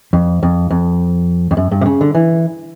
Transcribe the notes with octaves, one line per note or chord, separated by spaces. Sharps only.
F2
F2
F2
F2
F#2
G2
C3
C#3
D3
E3